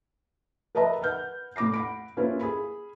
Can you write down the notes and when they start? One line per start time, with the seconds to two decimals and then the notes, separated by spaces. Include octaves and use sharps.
0.75 A#4 B4 D#5 E5 A#5 B5
1.02 B4 F#5 F6 G6
1.56 A2 B5 D6 A#6 C7
1.74 F#5 B5 D7
2.17 A#3 C#4 E4 F4 B4 C5
2.41 G#4 B5